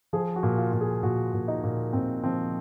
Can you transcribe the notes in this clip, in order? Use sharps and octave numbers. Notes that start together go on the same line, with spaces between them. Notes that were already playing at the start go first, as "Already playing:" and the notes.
F3 G#4
F#4
A#2
F4
A#2
G#4
A#2 F#4
A#2
D#4
A#2
A#2 C4
F3 C4